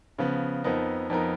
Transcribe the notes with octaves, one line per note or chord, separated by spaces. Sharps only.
C#3 F3 B3
F2 F3 B3 D#4 A#4
F2 F3 B3 D#4 A#4